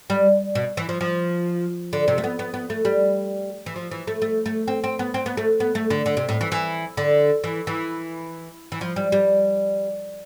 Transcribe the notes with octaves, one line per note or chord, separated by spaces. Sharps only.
G3
B2
E3
F3
F3
D3
C3
A3
B3
B3
B3
A3
G3
E3
F3
E3
A3
A3
A3
C4
C4
B3
C4
B3
A3
B3
A3
D3
D3
C3
A2
E3
E3
D3
E3
E3
E3
F3
G3
G3